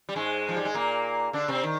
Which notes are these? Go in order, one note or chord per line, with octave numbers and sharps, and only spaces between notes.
G3
G#2 G#3
F3
G3
G#3
A#2 A#3
D3 D4
C3 C4
D#3